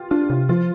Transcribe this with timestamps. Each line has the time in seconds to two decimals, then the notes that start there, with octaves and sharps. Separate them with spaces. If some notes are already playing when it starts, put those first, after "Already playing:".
Already playing: F4 G4
0.11 D4 F4
0.29 C3
0.49 F3 F4